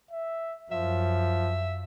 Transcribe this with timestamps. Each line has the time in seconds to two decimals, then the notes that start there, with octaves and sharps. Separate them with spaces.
0.11 E5
0.72 F#2 F3 E5